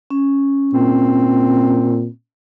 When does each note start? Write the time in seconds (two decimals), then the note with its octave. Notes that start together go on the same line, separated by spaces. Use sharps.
0.11 C#4
0.74 A#2 C4